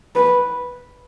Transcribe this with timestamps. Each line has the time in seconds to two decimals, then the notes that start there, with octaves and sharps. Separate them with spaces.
0.15 B4